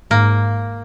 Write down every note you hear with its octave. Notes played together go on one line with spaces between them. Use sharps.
G#2 A#3